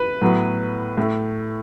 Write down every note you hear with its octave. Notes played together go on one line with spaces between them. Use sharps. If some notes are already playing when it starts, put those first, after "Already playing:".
Already playing: B4
A2 F#3 B3
A2 A3